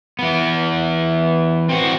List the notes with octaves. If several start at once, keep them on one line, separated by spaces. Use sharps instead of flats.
E3 B3
C4 F#4